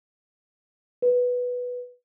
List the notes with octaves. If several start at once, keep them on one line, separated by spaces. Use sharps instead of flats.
B4